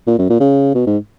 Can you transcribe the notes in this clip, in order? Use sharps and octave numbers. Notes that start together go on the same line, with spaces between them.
A#2
F#2
A#2
C#3
B2
G#2